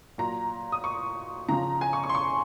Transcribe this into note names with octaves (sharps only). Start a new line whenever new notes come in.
A#2 F#3 A#5
D#6
C#6
C#3 F3 A#5
G#5
C#6
C#6
C6
C#6